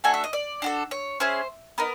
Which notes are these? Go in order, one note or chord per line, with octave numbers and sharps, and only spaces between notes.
A3 D4 F#4 A4 G#5
E5
D#5
D5
D4 F#4 A4
C#5
C#4 E4 G#4 C5
B3 D#4 A#4